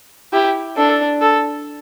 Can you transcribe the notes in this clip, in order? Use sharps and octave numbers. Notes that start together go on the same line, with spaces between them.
E4 G4
D4 A4
A4